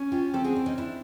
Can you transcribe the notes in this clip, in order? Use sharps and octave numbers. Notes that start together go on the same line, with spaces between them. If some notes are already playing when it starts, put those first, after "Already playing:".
Already playing: C#4
F4 G4
C4 G4 A4
F#4 G#4
D4 E4
C#4 D#4
D4 E4